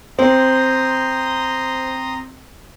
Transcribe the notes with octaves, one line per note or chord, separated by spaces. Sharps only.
C4 C5 A#5 C6 D#6